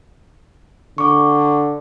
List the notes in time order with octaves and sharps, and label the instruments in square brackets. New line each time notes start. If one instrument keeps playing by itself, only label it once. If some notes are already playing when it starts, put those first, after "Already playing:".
[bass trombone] D3 [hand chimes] C#6 D6